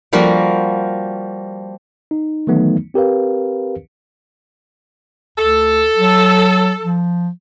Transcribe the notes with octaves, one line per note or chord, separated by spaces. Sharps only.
F3 G3 A#3 F4 F#4
D#4
D#3 E3 F#3 A3 B3 D#4
C4 G4 A#4 B4 F5
D2 A4
F#3
F3